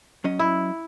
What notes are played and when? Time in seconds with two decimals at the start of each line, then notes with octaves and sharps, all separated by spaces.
0.24 F#3 C#4 D#5
0.39 E4